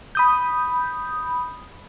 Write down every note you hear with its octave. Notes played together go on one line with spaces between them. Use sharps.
B5 D#6 G6